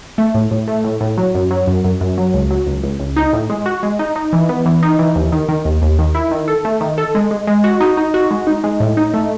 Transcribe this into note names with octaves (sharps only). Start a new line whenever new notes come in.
A3
A2
A2
A3
A2
A2
F#3
F#2
F#3
F#2
F#2
F#2
F#3
C#2
F#3
C#2
C#2
C#2
D#4
A2
G#3
F#4
G#3
D#4
D#4
E3
B3
E3
D#4
E3
D#2
D#3
D#3
D#2
D#2
D#3
E4
D#3
A4
A3
D#3
A4
G#3
G#3
G#3
F#4
D#4
D#4
F#4
G#3
D#4
G#3
A2
D#4
A3